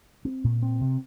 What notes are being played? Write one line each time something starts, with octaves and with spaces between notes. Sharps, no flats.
C4
A#2
C4
C3